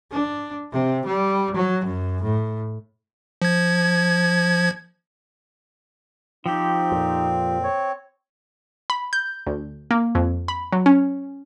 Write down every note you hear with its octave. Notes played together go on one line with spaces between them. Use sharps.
D4
C3
G3
F#3
F#2
A2
F3 G#6
F3 C4 D#4 G4
F2 A#2
C#5
B5
G6
D2
A#3
F2
B5
F#3
C#4